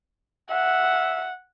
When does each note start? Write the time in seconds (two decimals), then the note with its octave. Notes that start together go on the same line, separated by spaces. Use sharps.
0.50 E5 F#5